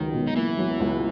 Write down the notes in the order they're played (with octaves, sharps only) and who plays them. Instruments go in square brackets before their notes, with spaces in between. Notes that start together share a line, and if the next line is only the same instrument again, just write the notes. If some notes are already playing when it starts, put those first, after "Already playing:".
Already playing: [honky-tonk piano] C#2 F#3 [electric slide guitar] D#3
[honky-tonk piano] B2
[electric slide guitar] D#4
[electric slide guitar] E3 E4 [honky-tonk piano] A#3
[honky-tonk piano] F#3
C#2